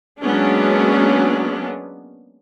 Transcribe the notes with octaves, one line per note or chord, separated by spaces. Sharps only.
F#3 G#3 A#3 B3 C#4 D4